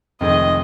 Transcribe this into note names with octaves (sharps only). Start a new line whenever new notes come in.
F1 F2 D#3 G#3 C4 D#5